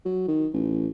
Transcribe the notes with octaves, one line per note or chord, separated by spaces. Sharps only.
F#3
D#3
A1